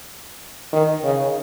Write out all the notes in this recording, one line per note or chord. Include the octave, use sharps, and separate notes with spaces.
D#3
C#3